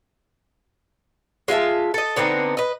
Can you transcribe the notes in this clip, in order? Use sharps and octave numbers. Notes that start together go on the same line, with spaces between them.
G#3 F4 E5 A5
A4 D#5
D3 B3 C4 D#4
B4 D#5